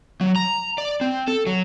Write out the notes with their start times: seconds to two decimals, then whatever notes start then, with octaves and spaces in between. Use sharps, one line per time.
0.21 F#3
0.36 A#5
0.78 D5
1.01 C4
1.28 A4
1.47 F#3